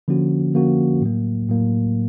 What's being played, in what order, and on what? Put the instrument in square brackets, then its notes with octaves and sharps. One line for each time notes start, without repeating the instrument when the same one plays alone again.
[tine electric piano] D3 F3 A#3 C#4 F#4
D3 F3 A#3 C#4 F#4
A2 F#3 A#3
A2 F#3 A#3